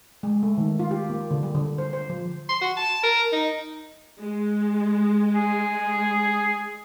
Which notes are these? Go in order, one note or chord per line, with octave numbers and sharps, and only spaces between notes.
G#3
A3
D#3
F4
G4
A#3
D3
G3
D3
C5
C5
F3
C6
F#4
A5
A#4
D#4
G#3
G#4